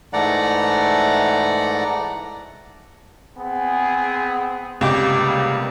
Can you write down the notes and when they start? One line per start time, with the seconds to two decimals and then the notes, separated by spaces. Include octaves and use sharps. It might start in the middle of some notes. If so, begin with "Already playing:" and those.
0.13 G#2 E3 A3 D5 F#5 A#5
3.37 B3 C4 G#4
4.81 C#2 C3 G3 A#3 B3 G4 D6